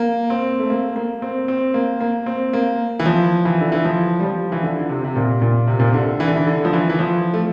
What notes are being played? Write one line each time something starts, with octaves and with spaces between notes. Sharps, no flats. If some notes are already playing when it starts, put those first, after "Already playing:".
Already playing: A#3
C4
A3
A#3
A#3
C4
C4
A#3
A#3
C4
A#3
E3
F3
E3
D3
E3
F3
G3
F3
E3
D3
D3
C3
C3
A#2
A#2
C3
A#2
C3
D3
E3
D3
E3
D3
F3
E3
E3
F3
A3